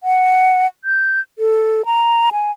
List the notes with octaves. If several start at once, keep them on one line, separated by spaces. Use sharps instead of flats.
F#5
G6
A4
A#5
G#5